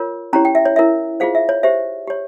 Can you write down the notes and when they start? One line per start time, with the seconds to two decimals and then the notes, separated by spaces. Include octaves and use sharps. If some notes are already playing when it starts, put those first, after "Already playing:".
Already playing: F4 A#4 C#5
0.33 C#4 E4 G4 C#5 A#5
0.45 G5
0.55 E5
0.65 C#5
0.76 E4 A#4 C#5 E5
1.20 F4 G#4 C5 F5
1.35 E5
1.49 C#5
1.63 G4 C5 E5
2.07 G4 C#5